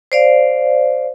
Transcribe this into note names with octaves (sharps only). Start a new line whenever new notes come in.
C5 D5 F5